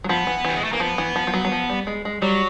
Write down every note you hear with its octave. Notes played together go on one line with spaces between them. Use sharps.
F#3
F3 B3
E3
E3 G3
G#3
A3
E3 A#3
F3 B3
E3
F3
F3
F#3
F#3
F3
G3
G#3
G#3
F#3 G3